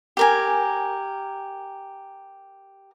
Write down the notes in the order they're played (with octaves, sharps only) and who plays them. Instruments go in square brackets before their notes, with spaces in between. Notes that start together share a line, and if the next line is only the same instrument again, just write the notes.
[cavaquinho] G4 A#4 G#5